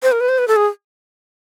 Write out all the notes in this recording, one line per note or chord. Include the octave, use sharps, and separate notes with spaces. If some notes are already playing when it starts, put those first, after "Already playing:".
C5
A#4
B4
C5
B4
A4
G#4